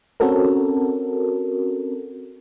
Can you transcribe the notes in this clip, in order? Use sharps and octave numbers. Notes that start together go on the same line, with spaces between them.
C4 C#4 F#4 A4 A#4